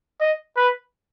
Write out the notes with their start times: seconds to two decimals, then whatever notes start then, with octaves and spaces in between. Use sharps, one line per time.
0.20 D#5
0.57 B4